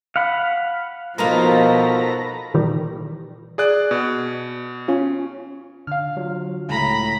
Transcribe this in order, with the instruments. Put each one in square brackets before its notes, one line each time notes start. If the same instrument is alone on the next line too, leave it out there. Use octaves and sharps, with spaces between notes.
[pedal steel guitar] F5 F#5 B5
[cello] B2 F3 [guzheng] A#3 D#4 F4 [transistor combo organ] A4 B4 A#5
[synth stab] A#2 D#3 E3 G3
[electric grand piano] G#4 D5 F#6
B2
[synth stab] C#4 F4
[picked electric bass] D3 [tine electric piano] F5 F6
[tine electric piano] F#3 F4
[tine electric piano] C#2 [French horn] A2 [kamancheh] A#5 B5